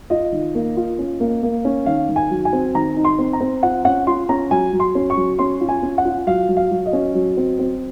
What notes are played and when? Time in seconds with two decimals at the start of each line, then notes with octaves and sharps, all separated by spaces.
0.10 F4 D#5
0.32 D#3
0.55 A#3
0.77 F4
0.99 C#4
1.20 A#3
1.43 A#3
1.65 C#4
1.86 D#3 F5
2.09 D#3
2.16 G#5
2.30 F#3
2.45 G#5
2.53 C4
2.75 D#3 A#5
2.97 D#4
3.04 C6
3.18 C4
3.33 A#5
3.41 C4
3.63 F4 F#5
3.85 C#4 F#5
4.07 F4 C6
4.29 C#4 A#5
4.51 F#3 G#5
4.73 F#3
4.80 C6
4.95 C#4
5.10 C#6
5.17 F#3
5.39 C#4 C6
5.61 F4
5.69 G#5
5.83 C#4
5.98 F#5
6.05 F4
6.27 F#3 F5
6.49 F#3
6.57 F5
6.71 F#3
6.86 D#5
6.93 C#4
7.15 F#3
7.37 C4
7.59 C4